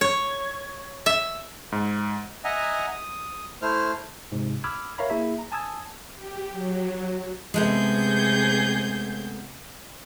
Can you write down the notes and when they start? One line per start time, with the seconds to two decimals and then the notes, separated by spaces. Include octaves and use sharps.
0.01 C#5
1.06 E5
1.72 G#2
2.44 D#5 E5 F#5 G#5 A#5
2.91 D#6
3.62 A3 E4 C5 F6
4.32 G#2 C3
4.64 B5 D6 E6 F6 G#6
4.98 A#4 C#5 E5 F5 A#5 B5
5.10 A#3 E4 G#4 E5
5.39 A#5
5.52 G#5 A5 D#6 E6 G#6
6.15 G4
6.51 F#3
7.54 C3 G#3 A3 B3 G#4 G6